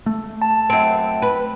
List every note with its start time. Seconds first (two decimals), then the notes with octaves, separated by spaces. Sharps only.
0.06 A3
0.42 A5
0.70 F#2 C4
1.22 B4